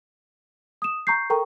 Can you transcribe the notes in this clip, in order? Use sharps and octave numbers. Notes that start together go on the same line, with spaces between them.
D#6 E7
A#5 C#6 G6 C7
A4 A#4 G5 A#5 C#6